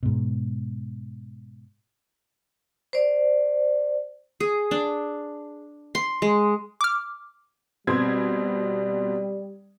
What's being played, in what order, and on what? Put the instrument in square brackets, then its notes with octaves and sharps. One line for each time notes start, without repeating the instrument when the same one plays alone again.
[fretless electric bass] G#2 B2
[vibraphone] C5 D5
[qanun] G#4
D4
C6
G#3
[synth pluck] D6 F6
[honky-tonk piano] B2 C4 G#6 [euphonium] G3